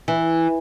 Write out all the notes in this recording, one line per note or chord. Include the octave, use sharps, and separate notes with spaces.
E3